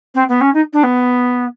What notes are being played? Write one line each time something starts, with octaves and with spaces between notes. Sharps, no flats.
C4
B3
C#4
D#4
D4
B3